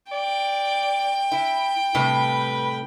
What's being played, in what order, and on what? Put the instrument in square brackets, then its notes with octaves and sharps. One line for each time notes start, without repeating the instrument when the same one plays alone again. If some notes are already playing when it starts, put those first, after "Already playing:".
[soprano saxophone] D5 [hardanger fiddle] G5
[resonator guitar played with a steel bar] E4
[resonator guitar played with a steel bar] A2 C3 G3 [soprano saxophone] B4